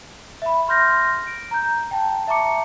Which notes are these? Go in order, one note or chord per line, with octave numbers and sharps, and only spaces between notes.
E5 B5
C6 F6 G6 A#6
D7
A#5 G6
G5 A5
E5 A5 A#5 C#6 D6 C#7